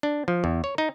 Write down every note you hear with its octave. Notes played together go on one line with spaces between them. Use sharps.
D4
F3
E2
C#5
D#4